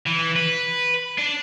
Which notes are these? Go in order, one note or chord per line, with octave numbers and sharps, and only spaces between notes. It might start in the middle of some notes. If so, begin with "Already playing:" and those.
E3
B4
D4